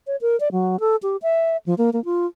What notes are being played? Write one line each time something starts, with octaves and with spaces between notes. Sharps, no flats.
C#5
A#4
D5
F#3
A4
G4
E5
F3
A#3
A#3
F4